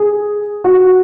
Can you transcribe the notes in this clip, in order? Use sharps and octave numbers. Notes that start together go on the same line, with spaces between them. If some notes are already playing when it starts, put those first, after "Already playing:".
Already playing: G#4
F#4